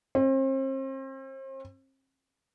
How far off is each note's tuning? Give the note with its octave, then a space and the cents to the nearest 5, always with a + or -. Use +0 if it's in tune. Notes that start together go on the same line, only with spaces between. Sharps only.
C4 +40